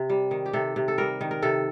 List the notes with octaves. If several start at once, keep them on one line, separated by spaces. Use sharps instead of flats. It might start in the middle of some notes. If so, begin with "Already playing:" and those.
Already playing: C3
G3
D#3
G4
C3 A4
C3
A4
G3 A#4
D#3
A#4
C3 A4